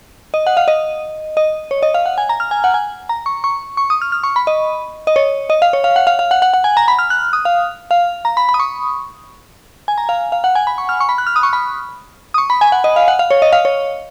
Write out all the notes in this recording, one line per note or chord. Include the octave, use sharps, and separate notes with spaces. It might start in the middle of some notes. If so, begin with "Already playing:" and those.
D#5
F#5
F5
D#5
D#5
C#5
D#5
F5
F#5
G#5
A#5
F6
G#5
F#5
G#5
A#5
C#6
C#6
C#6
D#6
F6
F6
C#6
B5
D#5
D#5
C#5
D#5
F5
C#5
F5
F#5
F5
F5
F#5
F#5
F#5
G#5
A#5
B5
F6
F#6
D#6
F5
F5
A#5
B5
B5
D#6
C#6
G#5
A#5
F5
F5
F#5
G#5
B5
C#6
F6
C#6
B5
F#6
F6
D#6
C#6
B5
D#6
C#6
B5
G#5
F#5
D#5
F5
F#5
F5
C#5
D#5
F5
C#5